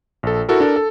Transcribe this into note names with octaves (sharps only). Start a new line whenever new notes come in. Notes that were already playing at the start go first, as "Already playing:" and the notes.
A#1 A4
E4 F#4 A4 A#4
D4 A4 A#4
A4